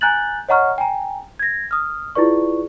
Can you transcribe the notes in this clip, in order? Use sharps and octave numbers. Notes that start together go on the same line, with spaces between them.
G#5 A#5 F#6 G6 A6 F#7
C#5 D#5 F#5 A#5 C#6 F6
G5 G#5 A#5
G#6 A#6
D#6 F6
E4 F4 G#4 B4 D5 C#6